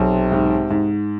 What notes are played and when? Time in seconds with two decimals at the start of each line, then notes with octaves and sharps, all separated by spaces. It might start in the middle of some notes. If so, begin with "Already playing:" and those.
Already playing: B1 C3
0.32 G#2
0.70 G#2